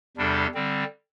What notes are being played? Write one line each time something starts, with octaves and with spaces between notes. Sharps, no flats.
E2 C3 G3 D4 A4
D3 G3 C4